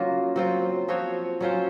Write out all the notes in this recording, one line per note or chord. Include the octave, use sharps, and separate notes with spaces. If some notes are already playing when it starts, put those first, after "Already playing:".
Already playing: C#3 F#3 A#3 F4 A#4
F#3 C4 F4
F3 C4 F#4 C#5
F#3 C#4 F4 C5